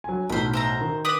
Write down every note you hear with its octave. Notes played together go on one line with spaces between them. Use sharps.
F#3 G#5
B1 A2 C5 B5
C5 E5 A#5
D#3
D4 B4 D#6